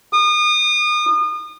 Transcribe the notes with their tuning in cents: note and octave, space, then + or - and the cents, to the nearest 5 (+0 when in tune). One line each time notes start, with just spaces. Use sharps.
D#6 -35